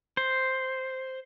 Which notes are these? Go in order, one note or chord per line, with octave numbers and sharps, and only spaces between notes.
C5